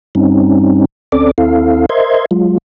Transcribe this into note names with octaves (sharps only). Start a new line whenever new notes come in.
G2 G3 C4 C#4 D#4
D2 C4 C#4 A4 D5 D6
D#2 C4 E4 A4 F5
A#4 C5 D#5 E5 C6 G#6
F#3 G#3 F4